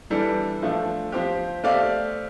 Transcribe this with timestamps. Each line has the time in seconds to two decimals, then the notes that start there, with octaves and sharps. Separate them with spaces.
0.10 E3 G3 D4 A4
0.62 F3 A3 D4
1.12 F3 C4 G4
1.63 A3 C4 G4 D5 F5